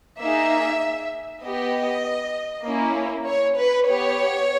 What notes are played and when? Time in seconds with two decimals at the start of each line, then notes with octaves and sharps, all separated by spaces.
0.19 A#3 D#4 G#4 E5
1.42 B3 G4 D#5
2.65 A#3 C#4 E4
3.26 C#5
3.57 B4
3.87 B3 G4 C#5